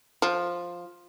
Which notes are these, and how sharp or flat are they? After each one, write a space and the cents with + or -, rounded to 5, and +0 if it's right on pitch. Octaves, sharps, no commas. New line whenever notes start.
F3 +5